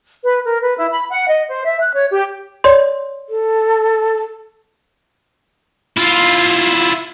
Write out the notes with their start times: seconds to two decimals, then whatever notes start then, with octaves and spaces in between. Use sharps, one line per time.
0.24 B4
0.45 A#4
0.62 B4
0.78 E4
0.92 B5
1.09 F#5
1.28 D#5
1.48 C5
1.65 E5
1.80 F#6
1.94 C#5
2.10 G4
2.64 C#5 D5 C6
3.29 A4
5.97 E4 F4